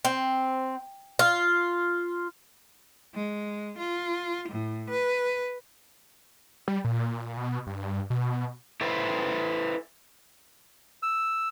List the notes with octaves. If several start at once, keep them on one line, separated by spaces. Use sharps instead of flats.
C4
F4
G#3
F4
A2
B4
G3
A#2
B2
G2
B2
E4 A4 B4 C5
E6